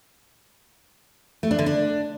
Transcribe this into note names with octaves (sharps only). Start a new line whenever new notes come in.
A3
D4
D3
D4